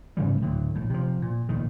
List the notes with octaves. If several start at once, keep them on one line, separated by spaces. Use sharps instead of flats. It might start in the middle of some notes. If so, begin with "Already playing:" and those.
G#2 C#3 E3 G3
D2 A2 D3 F#3
A#1 A2
C3 F3
A#2
A#1 A2 D#3